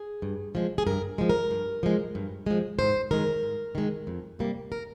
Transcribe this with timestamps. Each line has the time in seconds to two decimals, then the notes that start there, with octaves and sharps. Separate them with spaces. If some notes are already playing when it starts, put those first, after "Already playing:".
Already playing: G#4
0.22 G2
0.55 F3 G#3
0.78 G#4
0.87 G2 A#4
1.18 F3 G#3
1.29 A#4
1.51 G2
1.83 F3 G#3
2.15 G2
2.46 F3 G#3
2.79 G#2 C5
3.11 D#3 G#3 A#4
3.43 G#2
3.75 D#3 G#3
4.07 F2
4.39 C3 G3 A#3
4.72 A#4